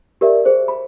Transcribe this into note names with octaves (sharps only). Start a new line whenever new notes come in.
G4 A#4 D5 E5
G#4 C5
B5